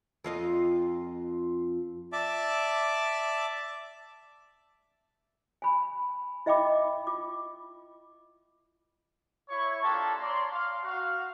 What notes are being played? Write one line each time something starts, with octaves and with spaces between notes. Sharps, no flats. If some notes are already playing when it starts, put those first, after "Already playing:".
F2 F4 D#5
D5 E5 A5 D6
G#5 B5
E4 D#5 E5 G5 B5 D6
F4 D6
E4 C#5 C#6
A#3 D4 F4 G4 A4 A5
C#5 D5 A#5 C6
F5
F#4 F5